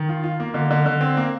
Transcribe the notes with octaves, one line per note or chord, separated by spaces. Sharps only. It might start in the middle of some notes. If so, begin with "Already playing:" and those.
Already playing: D#3
F4
F4
A#3
D3
D3
D3
C4
A#3